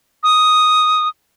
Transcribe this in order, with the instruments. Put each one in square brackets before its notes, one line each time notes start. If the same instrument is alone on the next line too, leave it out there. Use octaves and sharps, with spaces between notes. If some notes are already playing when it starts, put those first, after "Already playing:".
[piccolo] D#6